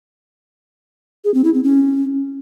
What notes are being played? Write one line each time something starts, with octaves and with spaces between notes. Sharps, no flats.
G#4
C4
E4
C4
C#4